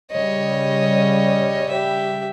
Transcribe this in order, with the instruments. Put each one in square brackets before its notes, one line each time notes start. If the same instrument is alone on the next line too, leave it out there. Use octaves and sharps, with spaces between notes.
[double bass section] C#3 G3 [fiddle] C#5 D#5
[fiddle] G4 E5